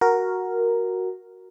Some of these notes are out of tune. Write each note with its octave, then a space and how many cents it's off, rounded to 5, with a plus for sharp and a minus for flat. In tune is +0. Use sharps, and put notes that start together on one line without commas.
F#4 +0 A#4 +0